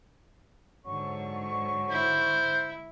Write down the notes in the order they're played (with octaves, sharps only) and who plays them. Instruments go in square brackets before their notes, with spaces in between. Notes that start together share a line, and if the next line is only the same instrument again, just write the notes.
[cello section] G#2 D3 [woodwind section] F#3 C#5 C#6
[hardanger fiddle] E4 [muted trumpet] C5